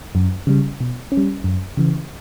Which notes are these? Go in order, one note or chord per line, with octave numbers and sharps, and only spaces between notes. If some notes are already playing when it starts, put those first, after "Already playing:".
F#2
C#3 G3
B2
C#4
G3
F#2
C#3 E3